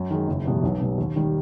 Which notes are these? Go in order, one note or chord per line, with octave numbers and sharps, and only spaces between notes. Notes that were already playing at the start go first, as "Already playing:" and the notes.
Already playing: F#2
D#3 G#3
F#1
E2 B2 G3
B1
B2 G3
D#2
D#3 G3